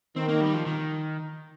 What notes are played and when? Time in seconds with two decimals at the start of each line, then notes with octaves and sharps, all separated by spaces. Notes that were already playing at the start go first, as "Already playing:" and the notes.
0.16 D#3 C4
0.28 A#3
0.41 G3
0.54 F3
0.66 D#3